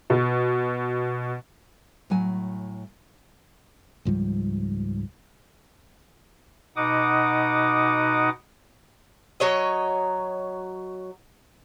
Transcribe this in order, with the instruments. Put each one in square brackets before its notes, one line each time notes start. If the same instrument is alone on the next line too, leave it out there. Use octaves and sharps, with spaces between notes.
[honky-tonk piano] B2
[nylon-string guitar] A2 F#3 G#5
[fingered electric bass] C#2 G#2 F3 G3
[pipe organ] B2 D#4 F#5 D6 D#6
[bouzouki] F#3 C#5 D#5